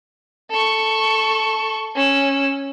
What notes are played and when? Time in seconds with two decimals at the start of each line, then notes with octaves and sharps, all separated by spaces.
0.51 A4 C#6
1.95 C#4 E6